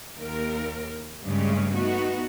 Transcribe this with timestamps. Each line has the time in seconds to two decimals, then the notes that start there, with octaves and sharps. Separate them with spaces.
0.18 D#2 A#4
1.24 G2 C#3 G#3 A3 C#4
1.74 A3 B3 D#4 F#4